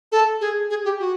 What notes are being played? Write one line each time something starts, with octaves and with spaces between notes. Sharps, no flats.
A4
G#4
G#4
G4
F#4